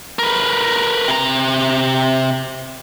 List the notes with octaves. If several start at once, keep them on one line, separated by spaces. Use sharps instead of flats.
A#4 B4
C3 A#5